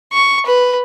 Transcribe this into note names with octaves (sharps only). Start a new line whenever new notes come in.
C#6
B4